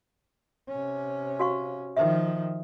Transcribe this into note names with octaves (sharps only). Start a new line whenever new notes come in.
C3 C#4
F#4 F5 C#6
D#3 F3 E5